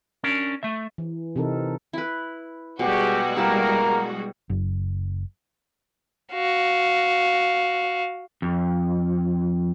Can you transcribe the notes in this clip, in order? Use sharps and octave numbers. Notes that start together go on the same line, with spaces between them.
C#4 D4 A#4
A3 E5
E3
C3 E3 C4 D#4 A4 A#4
E4 B4
B2 G3 G#3 F#4 G4
A#3 E4 G4 A#4 A5
F#1
F#4 F5
F2